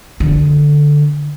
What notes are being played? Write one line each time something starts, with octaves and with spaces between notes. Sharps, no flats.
D3